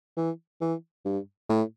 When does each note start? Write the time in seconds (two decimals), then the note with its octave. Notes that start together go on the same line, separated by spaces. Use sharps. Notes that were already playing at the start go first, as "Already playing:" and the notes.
0.17 E3
0.61 E3
1.05 G2
1.49 A2